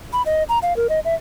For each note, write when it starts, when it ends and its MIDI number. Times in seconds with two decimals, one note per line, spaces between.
0.13 0.22 83
0.26 0.43 75
0.49 0.59 82
0.62 0.76 77
0.76 0.87 70
0.89 1.00 75
1.05 1.15 76